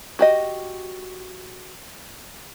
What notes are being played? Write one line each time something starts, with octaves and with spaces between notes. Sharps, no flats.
F#4 G4 D#5